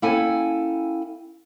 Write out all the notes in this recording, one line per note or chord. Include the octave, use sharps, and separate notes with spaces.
A#3 C#4 E4 A4 G5 G#5